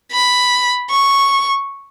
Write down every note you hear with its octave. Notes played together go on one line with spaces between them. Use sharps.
B5
C#6